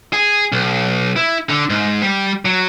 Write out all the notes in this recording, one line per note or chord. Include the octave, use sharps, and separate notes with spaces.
G#4
B1
E4
D3
G#2
G3
F#3